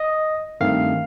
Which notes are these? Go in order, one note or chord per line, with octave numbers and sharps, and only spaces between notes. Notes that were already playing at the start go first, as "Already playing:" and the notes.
Already playing: D#5
G2 D#3 A3 C4 F5